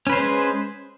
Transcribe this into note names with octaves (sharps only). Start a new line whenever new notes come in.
G#3 C#4 B4 C5